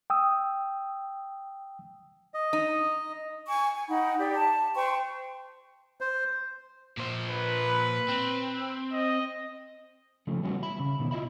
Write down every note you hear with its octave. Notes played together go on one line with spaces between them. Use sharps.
G5 D#6 E6
D#5
D#4
G#5 C#6
G#5
D#4 F#5 G5 B5
G4 D5
A5
C5 G5 C6 C#6
C5
A#2 C5
B4
C4
D#5
C#3 F3 A3
E3 G3 B3 C#4 F#4
E5 B5
C#3
B2 D#3
E4 F4 D#5 E5 B5